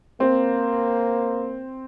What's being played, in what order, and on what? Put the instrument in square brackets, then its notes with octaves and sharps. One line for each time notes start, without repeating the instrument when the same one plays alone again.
[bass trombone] A#3 [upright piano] C4